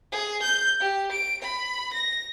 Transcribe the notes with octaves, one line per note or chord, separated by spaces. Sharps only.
G#4
G6
G4
D7
B5
A#6